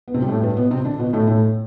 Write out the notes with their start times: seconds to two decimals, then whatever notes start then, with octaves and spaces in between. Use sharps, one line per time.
0.08 B3
0.14 C3 C4
0.22 G3
0.28 A2 A3
0.42 G2 G3
0.57 B2 B3
0.71 C3 C4
0.85 D3 D4
0.99 B2 B3
1.13 A2 A3
1.27 A2 A3